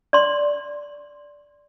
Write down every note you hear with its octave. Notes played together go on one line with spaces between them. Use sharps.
D5 C6